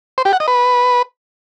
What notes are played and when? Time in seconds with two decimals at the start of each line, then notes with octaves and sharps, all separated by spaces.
0.18 C5
0.25 G4
0.33 F#5
0.40 D#5
0.48 B4